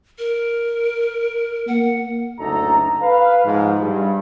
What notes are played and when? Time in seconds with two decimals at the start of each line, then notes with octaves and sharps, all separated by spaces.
0.19 A#4
1.68 A#3 F#5
2.39 F#1 D2 D#4 A4 A#5
3.02 B4 F5
3.45 G#2 F3
3.81 G2